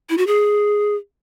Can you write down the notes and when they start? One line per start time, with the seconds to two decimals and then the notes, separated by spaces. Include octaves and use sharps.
0.10 E4
0.18 F#4
0.27 G#4